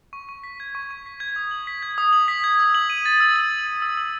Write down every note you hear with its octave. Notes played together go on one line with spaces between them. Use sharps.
C#6
C#6
B6
G#6
C#6
C#6
B6
G#6
D#6
F#7
B6
G#6
D#6
F#7
B6
G#6
E6
F#7
D#7
A6
E6
F#7
D#7
A6
E6
E6